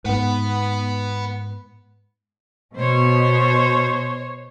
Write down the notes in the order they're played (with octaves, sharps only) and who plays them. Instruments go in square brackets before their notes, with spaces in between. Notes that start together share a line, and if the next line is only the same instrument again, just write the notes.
[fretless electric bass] G#2 B3 [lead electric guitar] B4 F#5
[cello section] B2 [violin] C5 C#5